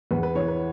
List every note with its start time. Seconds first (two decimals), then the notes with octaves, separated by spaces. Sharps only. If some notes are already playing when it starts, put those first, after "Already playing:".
0.11 E2 B4
0.23 B4
0.35 E3 C#5
0.48 B4